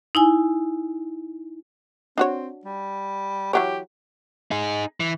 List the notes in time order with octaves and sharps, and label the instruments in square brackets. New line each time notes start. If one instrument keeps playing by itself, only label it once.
[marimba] D#4 E4 G#5
[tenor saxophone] C4 [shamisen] D4 F#4 C#5
[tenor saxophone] G3
[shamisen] E3 F#3 C#5 [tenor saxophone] G4
[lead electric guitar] D#4 G#4
E3